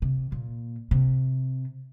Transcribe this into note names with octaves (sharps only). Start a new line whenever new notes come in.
C3
A#2
C3